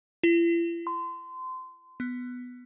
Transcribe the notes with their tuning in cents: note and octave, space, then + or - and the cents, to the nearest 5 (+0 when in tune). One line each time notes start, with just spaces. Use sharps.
E4 +45
C6 -25
B3 +5